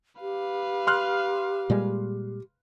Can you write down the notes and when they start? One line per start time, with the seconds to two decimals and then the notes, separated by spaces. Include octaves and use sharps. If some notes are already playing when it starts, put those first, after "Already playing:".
0.21 G4 B4 F5
0.87 C6 F6 F#6
1.70 A#2 G3 G#3